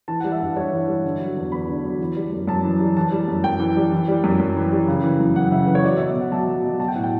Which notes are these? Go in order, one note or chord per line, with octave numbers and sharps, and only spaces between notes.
E3 A5
G3 F#5
E5
G2
G2 C#5
E3
G3
D3
F#3
E2
E2 B5
D3
F#3
E3
G3
F#2
F#2 A5
E3
G3
E3 A5
G3
F#2
F#2 G5
E3
G3
E3
G3
F#2
F#2
E3
G3
C#3
E3
F#2
F#2 F#5
C#3 E5
E3 B4
C#5
F#3 D5
E5
B2
E5
B2 F#5
F#3 A5
F#3
B2
F#3 A5
G5
A2 F#5
G5